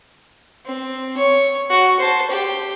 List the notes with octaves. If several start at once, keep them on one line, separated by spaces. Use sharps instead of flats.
C4
C#5
F#4
C5 A5
G4 G5